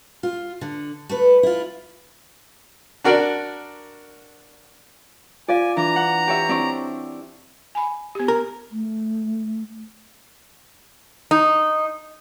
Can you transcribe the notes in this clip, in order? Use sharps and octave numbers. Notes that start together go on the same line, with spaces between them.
F4
D3
A3 B4
E4 F4
D4 F#4 A#4 D5
F4 D5 F5 G#5
E3 D4 A#5
F#5
G4 C#5 E5
C4 D4 E4 F#5 C#6
G#5 B5
B3 G4
A#4
A3
D#4